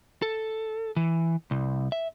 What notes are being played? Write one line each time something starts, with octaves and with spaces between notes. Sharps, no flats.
A4
E3
C2
E5